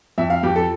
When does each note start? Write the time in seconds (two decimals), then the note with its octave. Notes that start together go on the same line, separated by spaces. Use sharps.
0.18 F2 E5
0.30 F5
0.43 F2 G4
0.56 A4